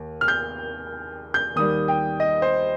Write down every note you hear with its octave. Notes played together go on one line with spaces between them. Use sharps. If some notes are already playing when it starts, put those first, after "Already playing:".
Already playing: D#2
F6
G6
G6
D#2 D#3 G3 D#6
G5
D#5
C5